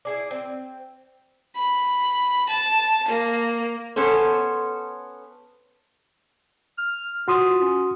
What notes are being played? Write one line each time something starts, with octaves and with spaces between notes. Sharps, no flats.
E4 G#4 D5
C4
B5
A5
A#3
B3 C#4 A4 C5
F6
F4 F#4 C6 D#6
C#4